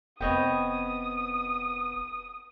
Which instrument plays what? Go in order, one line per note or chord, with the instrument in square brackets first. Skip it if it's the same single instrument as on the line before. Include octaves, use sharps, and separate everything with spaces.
[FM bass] F1 [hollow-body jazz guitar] B3 C4 B4 [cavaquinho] C#5 D#5 G5 [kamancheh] D#6